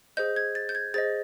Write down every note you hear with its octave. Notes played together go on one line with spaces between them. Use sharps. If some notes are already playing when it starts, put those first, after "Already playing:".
G#4 C5 D#5 G6
G#6
A6
G6
G#6
G#4 C5 D#5 A6